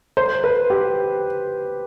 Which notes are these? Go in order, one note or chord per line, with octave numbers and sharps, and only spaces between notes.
C5
B4
G4